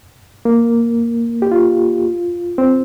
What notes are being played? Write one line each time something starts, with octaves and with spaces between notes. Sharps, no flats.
A#3
G4
F4
C4